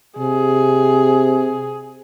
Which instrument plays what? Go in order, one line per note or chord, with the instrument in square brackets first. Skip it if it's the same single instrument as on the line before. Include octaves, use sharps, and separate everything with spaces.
[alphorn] C3 [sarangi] G#4